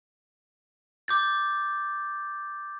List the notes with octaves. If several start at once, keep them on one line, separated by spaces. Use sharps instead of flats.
D6 G6 A6